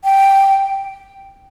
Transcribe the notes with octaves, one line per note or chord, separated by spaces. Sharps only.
G5